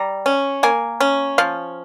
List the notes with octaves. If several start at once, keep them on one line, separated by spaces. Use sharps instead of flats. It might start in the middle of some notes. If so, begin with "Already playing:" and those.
Already playing: G3 A#5
C#4
A#3 G#5
C#4
F3 F5